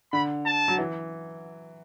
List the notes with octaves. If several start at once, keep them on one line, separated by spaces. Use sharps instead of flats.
D3 B5
A5
F#3
E3